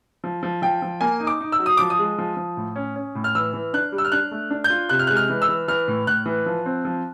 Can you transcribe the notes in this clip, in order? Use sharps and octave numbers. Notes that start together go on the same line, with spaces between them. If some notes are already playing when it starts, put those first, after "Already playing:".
F3
F3
F3 G5
F3
A#3 G#5
D#4
D6
D#4
E6
F#3
D#6
F3 D6
D#6
G#3
F3
F3
A2
C#4
C#4
A2
F6
E3 E6
E3
D4 F#6
G3
E6
F6
D4 F#6
A3
D4
G6
F4
C3 F#6
F6
F#6
G#3
F6
E3
E6
E3
E3 F6
A2
A2 F#6
E3
F3
C4
F3